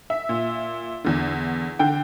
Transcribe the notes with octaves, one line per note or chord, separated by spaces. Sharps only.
E5
A#2
E2 D3
D3 G5